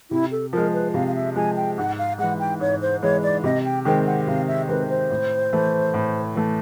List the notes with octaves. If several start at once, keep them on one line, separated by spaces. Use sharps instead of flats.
C3 E4
A4
F3 G#3 A#4
B4
C3 F5
F5
E5
F3 G#3 G#5
G5
G#2 F#5
F5
E3 G#3 F#5
G5
G#2 C#5
C5
E3 G#3 C#5
D5
C3 D#5
G5
D#3 G#3 C4 G5
F#5
C3 F5
E5
D#3 G#3 C4 B4
C5
A2
E3 A3
A2
E3 A3